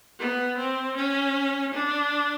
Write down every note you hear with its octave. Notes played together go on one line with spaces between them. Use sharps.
B3
C4
C#4
D4